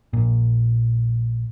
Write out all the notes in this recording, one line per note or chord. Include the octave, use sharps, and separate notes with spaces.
A#1 A#2